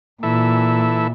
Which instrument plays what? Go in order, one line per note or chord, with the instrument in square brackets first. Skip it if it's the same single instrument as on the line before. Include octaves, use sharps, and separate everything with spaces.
[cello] A#2 [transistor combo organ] E3 A4 E5